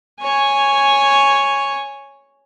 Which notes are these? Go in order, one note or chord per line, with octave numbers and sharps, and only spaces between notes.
C#5 G#5